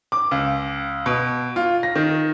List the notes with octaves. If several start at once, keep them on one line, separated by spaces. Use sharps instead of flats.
D6
C#2
B2
F4
A#6
D#3